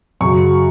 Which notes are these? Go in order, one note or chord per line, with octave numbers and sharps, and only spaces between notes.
F#2 C#3 F#3 C#6